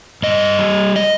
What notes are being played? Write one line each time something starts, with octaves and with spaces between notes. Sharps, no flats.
G2 D#5
G3
D#5